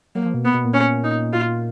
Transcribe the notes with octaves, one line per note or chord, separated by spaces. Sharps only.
F#3 A#3
F3
B2
B3
B2
A#2
C#4
D#4
A#2 F4